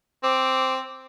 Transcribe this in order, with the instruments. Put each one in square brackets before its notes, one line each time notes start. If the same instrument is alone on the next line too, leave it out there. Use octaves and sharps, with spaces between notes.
[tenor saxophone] C4 [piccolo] D6